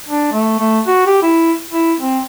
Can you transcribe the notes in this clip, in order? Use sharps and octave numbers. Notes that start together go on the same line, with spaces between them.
D4
A3
A3
F#4
G4
E4
E4
C4